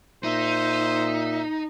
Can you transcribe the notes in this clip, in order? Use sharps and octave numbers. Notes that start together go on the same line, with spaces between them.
A#2 D#4 C5 E5